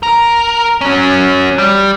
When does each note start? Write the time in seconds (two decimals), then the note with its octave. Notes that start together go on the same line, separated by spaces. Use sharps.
0.03 A#4
0.81 F#3 C#4
1.58 G3